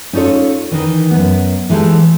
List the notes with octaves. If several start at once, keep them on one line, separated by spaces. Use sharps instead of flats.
C#4 D#4 F4 A4 C#5
D#3 E3
F#2 B3
E3 G#3 E4 G4 A4